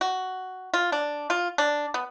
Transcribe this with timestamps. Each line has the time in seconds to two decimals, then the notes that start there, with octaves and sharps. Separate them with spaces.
0.01 F#4
0.74 F4
0.92 D4
1.30 F4
1.58 D4
1.94 B3